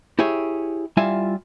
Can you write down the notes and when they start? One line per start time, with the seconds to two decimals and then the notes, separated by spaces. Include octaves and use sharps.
0.19 E4 G4 G#4 C#5
0.97 G3 E4 F4 E5 G#5